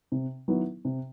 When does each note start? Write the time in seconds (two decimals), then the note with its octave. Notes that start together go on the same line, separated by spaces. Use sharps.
0.12 C3
0.48 D#3 F#3 B3 E4
0.85 C3